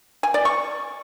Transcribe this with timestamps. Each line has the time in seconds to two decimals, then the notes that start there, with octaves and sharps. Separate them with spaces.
0.23 G#5
0.34 D5
0.45 C#6